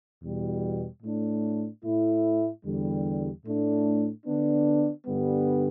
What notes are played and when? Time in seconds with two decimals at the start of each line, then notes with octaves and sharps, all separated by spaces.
0.22 E2 B2 G3
1.03 A2 A3 D4
1.85 A2 A3 E4
2.65 E2 D3 G3
3.46 A2 A3 D4
4.27 D3 B3 D4
5.07 G2 D3 G3 B3